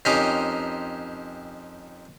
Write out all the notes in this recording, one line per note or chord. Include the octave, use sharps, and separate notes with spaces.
F2 C#4 D#4 G4 A#4 C5